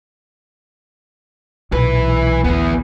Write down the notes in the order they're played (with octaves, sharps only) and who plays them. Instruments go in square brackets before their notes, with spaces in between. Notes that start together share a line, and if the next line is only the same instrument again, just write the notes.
[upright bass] B1 A#2 [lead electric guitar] E3 B4
[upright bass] A1 D2 [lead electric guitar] E3 B3